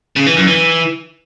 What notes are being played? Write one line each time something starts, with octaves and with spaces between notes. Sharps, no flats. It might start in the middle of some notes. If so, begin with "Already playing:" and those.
C#3
E3
F#2
E3